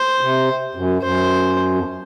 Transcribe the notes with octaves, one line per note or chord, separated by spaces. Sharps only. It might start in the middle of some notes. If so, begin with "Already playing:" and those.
Already playing: C5
C3
F#2
F#2 C5
F2